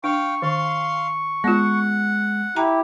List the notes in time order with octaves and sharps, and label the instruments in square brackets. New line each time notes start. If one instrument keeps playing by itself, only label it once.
[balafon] D4 [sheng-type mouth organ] F5 G5 [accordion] C#6
[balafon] D#3 [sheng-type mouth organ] F5 C6
[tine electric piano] G#3 [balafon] B3 F4 [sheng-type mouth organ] F#5
[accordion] E4 G4 [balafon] G5 A#5